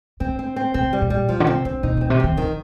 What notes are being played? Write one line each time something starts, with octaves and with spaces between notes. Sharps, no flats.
D3 C4
C4
C4
C3 C4
G3
A#2
G3
A#2 F3
D3
C3 C4
D3 C4
A#2 D#4
A#2 C4
C3
D#3 C4
D#3 F3